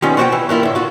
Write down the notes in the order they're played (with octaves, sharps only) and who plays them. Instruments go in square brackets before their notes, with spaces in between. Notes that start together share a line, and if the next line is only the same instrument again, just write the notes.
[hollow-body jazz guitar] D#3 G3 B3 C#4 F4
F4 F#4 C5 C#5 F#5 G5
E3
G2 A#3 E4 F4
A2 D3
F4 F#4